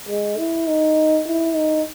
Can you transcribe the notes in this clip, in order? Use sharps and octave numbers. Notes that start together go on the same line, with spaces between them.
G#3
E4
D#4
E4
D#4